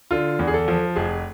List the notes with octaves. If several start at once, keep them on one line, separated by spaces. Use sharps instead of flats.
D3 F4
E2
G#4
A4
F3
F1 G#4